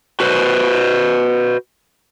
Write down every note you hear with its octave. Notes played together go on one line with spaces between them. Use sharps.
F#4 B4 C5